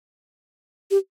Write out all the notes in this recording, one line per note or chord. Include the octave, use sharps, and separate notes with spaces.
G4